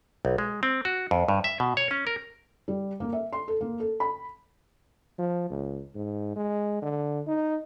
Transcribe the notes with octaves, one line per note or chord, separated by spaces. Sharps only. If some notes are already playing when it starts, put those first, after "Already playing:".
B1
G#3
C4
F#4
F2
G2
E5
B2
C#5
C#4
A#4
G3
A#3
E5
C6
A4
A#3
A4
B5
F3
C#2
G#2
G#3
D3
D#4